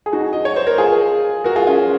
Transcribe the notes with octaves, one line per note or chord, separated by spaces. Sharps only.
G#4
D#4 F#4
D#5
C#5
C5
A#4
F4 G#4
F#4 A#4
F4 G#4
C#4 F4